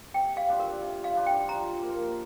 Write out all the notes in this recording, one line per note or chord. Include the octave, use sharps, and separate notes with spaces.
C3 G5
F5
G3 D4 F4
A#4
C3
F5
G3 D4 F4
G5
F3 A#5
A#3 F4 A#4